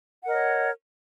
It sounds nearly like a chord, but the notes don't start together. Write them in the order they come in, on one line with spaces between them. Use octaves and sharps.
F#5 A#4 D#5 C#5